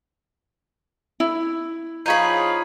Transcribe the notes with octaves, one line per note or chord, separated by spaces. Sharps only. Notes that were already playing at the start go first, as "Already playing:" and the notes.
E4
F3 D#4 G#4 C#5 F5 B5